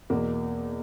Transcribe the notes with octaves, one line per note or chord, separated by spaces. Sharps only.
E2 B2 A#3